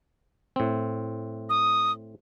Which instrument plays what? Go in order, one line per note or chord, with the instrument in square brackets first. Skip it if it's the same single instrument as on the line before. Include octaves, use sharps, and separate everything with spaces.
[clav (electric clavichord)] A2 C4
[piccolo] D#6